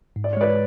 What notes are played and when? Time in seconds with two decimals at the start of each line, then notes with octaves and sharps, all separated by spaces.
0.16 G#2
0.24 D5
0.33 C#5
0.37 G#3 B4 D5